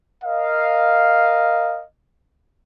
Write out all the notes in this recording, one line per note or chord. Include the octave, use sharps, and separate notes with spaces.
A#4 D#5 F5